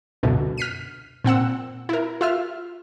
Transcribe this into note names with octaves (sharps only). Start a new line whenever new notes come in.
C#2 F#2 B2 D3
F6 B6 C7 D#7
A#2 C4 F#5 E6
E4 A#4
F4 E5 F6